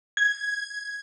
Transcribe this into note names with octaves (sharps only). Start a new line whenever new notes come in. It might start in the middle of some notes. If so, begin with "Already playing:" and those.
G#6